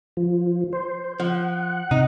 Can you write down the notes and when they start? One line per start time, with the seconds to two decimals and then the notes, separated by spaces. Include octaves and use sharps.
0.17 F3
0.73 C5
1.20 F3 F#5
1.91 C3 D#4